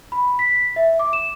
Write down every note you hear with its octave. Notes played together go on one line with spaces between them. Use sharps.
B5
B6
E5
D6
E7